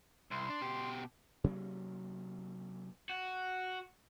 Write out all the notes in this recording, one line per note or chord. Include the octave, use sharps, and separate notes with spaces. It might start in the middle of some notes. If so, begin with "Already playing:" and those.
C2 C6
D4
B2 G4
C3 F#3 A#3 C#4
F#4